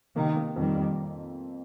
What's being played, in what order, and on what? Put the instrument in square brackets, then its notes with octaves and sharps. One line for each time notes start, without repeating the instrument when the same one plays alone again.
[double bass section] C3 D#3 [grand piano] A#3
[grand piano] A#3
[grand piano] F2 [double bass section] D#3 G3
[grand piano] F2